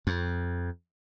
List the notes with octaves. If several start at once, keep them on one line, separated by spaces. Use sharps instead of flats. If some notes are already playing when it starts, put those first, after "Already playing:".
F2